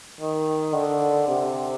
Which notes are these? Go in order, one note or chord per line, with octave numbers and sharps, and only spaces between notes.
D#3
D3
C3